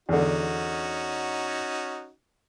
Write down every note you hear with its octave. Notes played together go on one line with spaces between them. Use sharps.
E2 D3 C#4 D#4 F#4